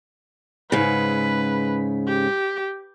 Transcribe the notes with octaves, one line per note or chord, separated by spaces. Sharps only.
G#2 C#3 B4
G4